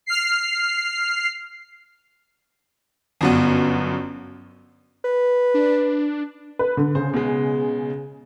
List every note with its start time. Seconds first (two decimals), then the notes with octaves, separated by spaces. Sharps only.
0.06 F6 C7
3.21 G1 F#2 B3
5.04 B4
5.54 D4
6.59 B4
6.77 D3
6.95 C#3 C5
7.13 B2 G#3